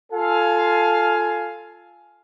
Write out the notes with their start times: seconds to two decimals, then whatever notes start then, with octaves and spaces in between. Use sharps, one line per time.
0.13 F4 A4 F5 G#5